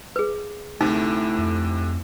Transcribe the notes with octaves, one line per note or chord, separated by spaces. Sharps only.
G#4 B4
D2 C3 A3 D#4 E4
F2